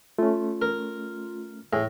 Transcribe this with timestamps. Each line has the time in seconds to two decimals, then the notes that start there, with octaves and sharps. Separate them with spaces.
0.18 A3 C#4 F4
0.62 A#4
1.73 A2 G#4 A#6